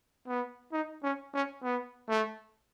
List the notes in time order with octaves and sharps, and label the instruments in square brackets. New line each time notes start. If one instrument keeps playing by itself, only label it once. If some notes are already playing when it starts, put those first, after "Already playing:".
[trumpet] B3
D#4
C#4
C#4
B3
A3